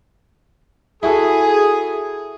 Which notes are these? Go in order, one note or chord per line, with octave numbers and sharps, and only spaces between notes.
E4 F#4 G#4 A4